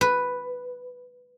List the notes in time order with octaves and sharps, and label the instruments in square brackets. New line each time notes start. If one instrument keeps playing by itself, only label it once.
[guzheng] B4